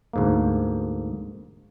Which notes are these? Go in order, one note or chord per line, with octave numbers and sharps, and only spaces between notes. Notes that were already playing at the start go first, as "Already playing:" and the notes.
D2 G#2 A#3